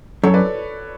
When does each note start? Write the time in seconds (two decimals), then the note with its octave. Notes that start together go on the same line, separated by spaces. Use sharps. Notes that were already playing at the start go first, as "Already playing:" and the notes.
0.23 F#2 A4 C#5
0.34 B4 D5